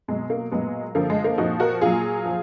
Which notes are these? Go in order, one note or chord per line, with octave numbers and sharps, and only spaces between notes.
B2 F#3 G#3
A#3
A#2 F#3 G#3 B3
D3 F3 A#3
G#3
A#3
A#2 F3 D#4 F#4
F#4 A#4
A#2 F#3 F4 G#4
F3